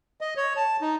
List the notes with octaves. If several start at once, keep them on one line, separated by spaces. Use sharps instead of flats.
D#5
C#5
A5
D#4